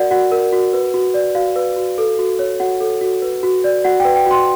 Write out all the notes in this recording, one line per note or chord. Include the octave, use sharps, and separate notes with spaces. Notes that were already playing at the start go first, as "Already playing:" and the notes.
Already playing: F#4 A#4 D5 F#5
F#4 F#5
A#4
F#4
B4
F#4
D5
F#4 F5
B4
F#4
A4
F#4
C#5
F#4 F#5
A4
F#4
B4
F#4
D5
F#4 F#5
B4 G5
G5
F#4 C6